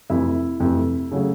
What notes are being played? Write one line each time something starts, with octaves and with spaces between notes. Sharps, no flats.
F2 C3 E3 A3 E4 E5
F2 C3 E3 A3
C#3 F#3 A3